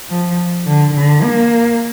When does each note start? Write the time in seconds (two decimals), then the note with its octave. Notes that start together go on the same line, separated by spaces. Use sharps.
0.10 F3
0.66 D3
0.94 D3
1.23 A#3